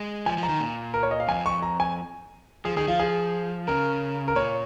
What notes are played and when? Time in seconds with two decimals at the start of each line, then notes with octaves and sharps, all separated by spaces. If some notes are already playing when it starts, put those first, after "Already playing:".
Already playing: G#3
0.26 F3 G#5
0.38 F3
0.43 A#5
0.49 D#3
0.60 A#2
0.94 A#4
1.03 C#5
1.11 D#5
1.20 F5
1.28 F2 G#5
1.46 C#6
1.62 A#5
1.80 G#5
2.65 F3 G#4
2.77 D#3 G#4
2.88 F3 F4
2.99 G#4
3.68 C#3 A#4
4.28 A#4
4.35 A#2 C#5